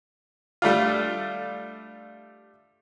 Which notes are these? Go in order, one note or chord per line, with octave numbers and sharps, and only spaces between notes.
G3 A3 D4 F4